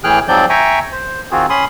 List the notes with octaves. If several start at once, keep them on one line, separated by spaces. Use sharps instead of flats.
A2 E3 G#4 G5 F6 F#6
G#2 F3 F#3 C4 D5 G6
E5 G5 G#5 A#5 C#6
C5
D#3 C4 F4 F#4 G#4
C#4 B5 C6 D#6